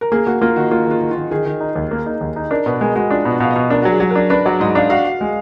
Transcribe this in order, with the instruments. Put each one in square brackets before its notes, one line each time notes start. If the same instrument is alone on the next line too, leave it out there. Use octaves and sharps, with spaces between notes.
[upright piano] A#4
[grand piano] A#3 [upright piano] G#4
[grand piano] A#3 [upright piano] F#4
[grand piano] A#3 [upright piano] F4
[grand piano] D#3 [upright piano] F#4
[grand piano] A#3 [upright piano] F4
[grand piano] D#3 [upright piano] F4
[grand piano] D#3
[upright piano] F4
[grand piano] D#3
[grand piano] D#3 [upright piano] G#4
[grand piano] D#3
D#4
D#2
A#3
D#4
D#2
D#4
[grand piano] D4 [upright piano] A#4
[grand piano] B2 [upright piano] B4
[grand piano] G#3 [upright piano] A#4
[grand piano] G#3 [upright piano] F#4
[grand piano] D4 [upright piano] F4
[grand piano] B2
[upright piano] F#4
[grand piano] B2 [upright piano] F5
[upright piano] D#5
[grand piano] B2
[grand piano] D4 [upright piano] A#4
[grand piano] F#3 [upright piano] F#4
[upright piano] G#4
[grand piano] F#3
[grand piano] D4 [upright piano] A#4
[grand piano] D4 [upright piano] B4
[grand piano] F#3 [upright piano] D5
[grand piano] G#2 [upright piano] D#5
[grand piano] D4 [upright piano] F5
[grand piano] F#4 [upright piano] F5
[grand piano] F#4
G#3